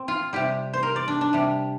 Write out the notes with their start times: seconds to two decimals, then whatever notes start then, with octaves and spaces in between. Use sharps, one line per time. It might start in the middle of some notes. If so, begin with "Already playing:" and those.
Already playing: A#2 C4
0.08 F4
0.33 C3 G3 G4
0.73 C5
0.83 A#4
0.96 D5
1.08 D4
1.21 D4
1.33 C3 G3